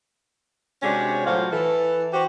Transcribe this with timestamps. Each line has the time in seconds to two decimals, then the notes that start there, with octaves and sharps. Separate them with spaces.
0.83 C3 G#3 C#4 D4 F#4 C#5
1.25 A2 F#3 F4 F#4 C5 F5
1.51 E3 A4
2.12 F#4 G4 C5